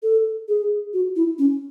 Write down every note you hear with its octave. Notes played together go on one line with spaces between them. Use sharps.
A4
G#4
F#4
E4
C#4